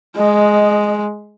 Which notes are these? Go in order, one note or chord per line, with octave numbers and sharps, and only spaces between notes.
G#3 D#5